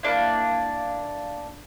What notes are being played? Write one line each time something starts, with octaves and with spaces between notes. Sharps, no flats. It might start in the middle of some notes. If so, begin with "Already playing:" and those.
A#3 D4 E4